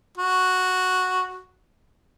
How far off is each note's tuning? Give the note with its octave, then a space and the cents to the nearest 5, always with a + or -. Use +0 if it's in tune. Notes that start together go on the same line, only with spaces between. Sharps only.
F#4 -5